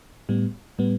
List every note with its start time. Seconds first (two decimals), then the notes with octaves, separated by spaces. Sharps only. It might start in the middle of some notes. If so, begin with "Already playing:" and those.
0.29 A2 G3 B3
0.79 A2 G3 B3